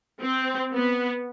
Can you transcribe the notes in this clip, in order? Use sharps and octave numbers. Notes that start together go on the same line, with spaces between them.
C4
B3